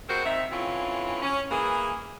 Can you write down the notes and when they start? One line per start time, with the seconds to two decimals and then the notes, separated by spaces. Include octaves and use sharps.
0.09 G3 G#3 C4 F#4 A#4 C5
0.25 D#3 C4 D#4 E5
0.52 D3 E3 C4 C#4 E4 F4
1.22 C#4
1.51 E3 A#3 G#4